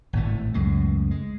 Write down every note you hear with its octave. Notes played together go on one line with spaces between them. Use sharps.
G#1 A2 A3
C#2 F#2 G#3 A3
G#3